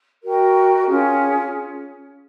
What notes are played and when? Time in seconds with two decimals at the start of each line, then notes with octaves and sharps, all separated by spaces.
0.23 F#4 A#4 D#5 G5
0.85 C#4 F4 G#4